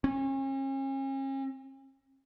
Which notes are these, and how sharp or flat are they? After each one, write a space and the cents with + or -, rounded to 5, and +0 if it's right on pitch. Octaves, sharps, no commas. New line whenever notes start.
C#4 -40